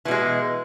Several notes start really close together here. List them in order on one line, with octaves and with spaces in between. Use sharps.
E3 B2 G#3